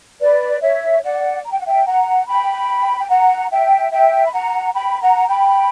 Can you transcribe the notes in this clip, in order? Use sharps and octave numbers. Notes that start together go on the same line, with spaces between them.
B4 D5
C#5 E5
D5 F#5
A#5
G5
F#5
E5 G5
F#5 A#5
G5 B5
G5
F#5 A#5
E5 G5
E5 G5
B5
F#5 A#5
G5 B5
F#5 A#5
G5 B5